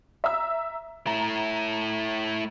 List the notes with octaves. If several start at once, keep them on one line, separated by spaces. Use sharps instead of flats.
E5 A#5 E6
A3 E4 A#5